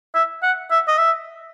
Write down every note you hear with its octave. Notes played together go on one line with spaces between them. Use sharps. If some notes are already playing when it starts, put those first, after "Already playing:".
E5
F#5
E5
D#5
E5